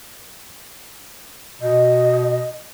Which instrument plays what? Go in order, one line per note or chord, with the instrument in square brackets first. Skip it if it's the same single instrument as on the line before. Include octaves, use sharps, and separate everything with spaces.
[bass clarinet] B2 [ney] D#5